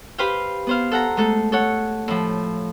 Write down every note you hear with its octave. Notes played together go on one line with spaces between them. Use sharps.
G4 B4 C5 F5 G5
B3 C5 F5
A4 F#5 A#5
G#3 A3 A4
A4 C#5 F#5
A2 F3